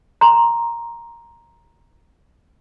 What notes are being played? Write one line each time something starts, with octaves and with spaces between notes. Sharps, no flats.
A#5 C6